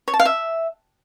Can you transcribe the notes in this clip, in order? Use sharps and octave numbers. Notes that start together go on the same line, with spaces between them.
C#5
A5
F5
E5